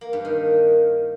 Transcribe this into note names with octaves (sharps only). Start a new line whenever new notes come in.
A#3
G2
D#3